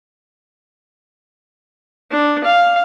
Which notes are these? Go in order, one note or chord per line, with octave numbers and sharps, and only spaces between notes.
D4
F5